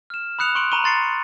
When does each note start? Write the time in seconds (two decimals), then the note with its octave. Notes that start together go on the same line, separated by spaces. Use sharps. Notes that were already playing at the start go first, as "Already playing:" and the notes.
0.10 F6 E7
0.39 B5 D#6 F#6 C#7 F7
0.55 C6 C#6 F#6 D7 F7 F#7
0.72 A#5 B5 C#6 D#7 G7
0.84 C6 A6 C7 C#7